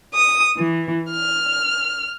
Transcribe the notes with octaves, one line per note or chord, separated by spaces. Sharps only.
D#6
E3
F6